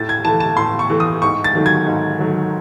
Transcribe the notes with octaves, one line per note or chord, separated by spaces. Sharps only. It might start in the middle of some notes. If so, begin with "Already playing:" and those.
Already playing: A2 A6
G#6
E3 A3 A5
A5
A2 C6
C#6
E3 A3
D#6
G#2 C#6
A6
D#3 F#3 A3
G#6
G#2
D#3 F#3 A3